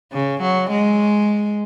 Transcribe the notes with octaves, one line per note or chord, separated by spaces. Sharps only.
C#3
F#3
G#3